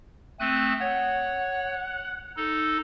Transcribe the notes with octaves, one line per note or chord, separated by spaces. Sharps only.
A3 C4 D#6 F#6
C#5 F#5
D#4 A4